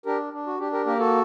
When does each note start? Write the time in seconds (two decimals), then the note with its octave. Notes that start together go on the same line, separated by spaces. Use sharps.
0.06 D4 G4 A#4
0.33 D4
0.47 F#4
0.59 D4 G4
0.72 G4 A#4
0.86 A#3 G4 A#4
0.99 F#4 A4